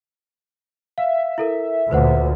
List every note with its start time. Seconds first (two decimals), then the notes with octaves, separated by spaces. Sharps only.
0.98 E5 F5
1.38 E4 A4 A#4
1.91 D2 A#2 B4 C5 F#5